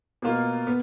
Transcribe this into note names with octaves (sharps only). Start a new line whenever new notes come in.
B2 A#3 F4
B3